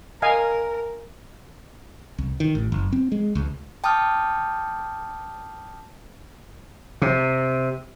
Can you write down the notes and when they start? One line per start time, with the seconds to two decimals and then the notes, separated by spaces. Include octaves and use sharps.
0.22 A#4 D#5 F5 G#5
2.18 C2
2.40 D#3
2.55 A1
2.72 F#1
2.93 C4
3.12 G#3
3.35 C#2
3.84 G5 A5 D6 D#6 F6 G6
7.02 C3